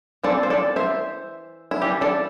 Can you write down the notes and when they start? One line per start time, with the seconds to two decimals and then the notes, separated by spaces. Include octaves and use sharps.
0.23 E3 C4 A4 D5
0.43 C5
0.50 A4 D5
0.76 C5 E5
1.71 E4
1.82 E3 G3 D4 G4
2.01 A4 D5